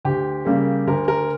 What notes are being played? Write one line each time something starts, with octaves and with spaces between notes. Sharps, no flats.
D2 G4
C#3 G3 A#3
D2 A#4
A#4